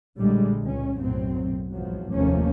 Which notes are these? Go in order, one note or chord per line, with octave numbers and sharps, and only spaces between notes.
A#1 A2 D3 G3 G#3
C#2 A#2 C#4
B1 F#2 A2 F#3 C4
A1 E2 G#2 F3 F#3
F1 D#2 F3 A3 A#3 C#4